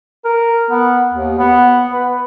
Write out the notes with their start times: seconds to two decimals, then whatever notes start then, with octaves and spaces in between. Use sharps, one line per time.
0.24 A#4
0.70 B3
1.13 D#2
1.38 B3
1.92 B4